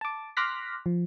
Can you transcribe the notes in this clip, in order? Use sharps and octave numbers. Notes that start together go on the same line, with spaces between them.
A5 D6
C6 D6 F6 F#6 A#6 B6
F3